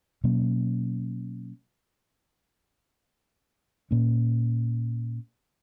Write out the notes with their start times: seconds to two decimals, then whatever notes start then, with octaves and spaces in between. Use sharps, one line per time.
0.24 B2 F#3 A#3 C#4
3.91 A#2 A#3 C#4